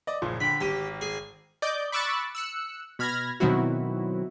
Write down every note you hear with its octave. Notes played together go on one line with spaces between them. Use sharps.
D5 D#5
F#1 A#2 F3
D3 G5 B5
G#1 G4 D#7
G#4
D5 D#5 D6 G6
B5 C#6 D6 E6 F#6 A6
E6 F#6 C#7
B2 B5 F6 G#6 A#6
B2 D#3 F#3 C4 E4 F#4